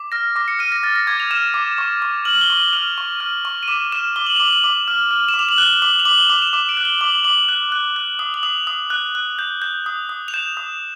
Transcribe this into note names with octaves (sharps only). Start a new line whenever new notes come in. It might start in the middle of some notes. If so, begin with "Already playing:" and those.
Already playing: D6
F6 A#6
D6 A#6
C#7
F6 D#7
A#6
F6 A6
A#6
D6 G#6
F7
F6 E7
D6
C#6
C#6
F6 F#7
G7
C#6 F#7
F6 F7
C#6
F6
C#6
D#7
D6 E7
F6 E7
D6 G7
F#7
D6 F7
F#7
D6
F6
F6
E7
D6
F7
F#7
F#6 G7
D6 F#7
F7
D6 F#7
G7
D6 F7
E7
D6 E7
D7
F#6
G7
D6 F#7
D6 F#7
F#6
F#6
F#6
D#6
F#7
D#6 F7
D#6
F#6
F#6
G6
G6
D#6
D#6
F7
G6 E7
D#6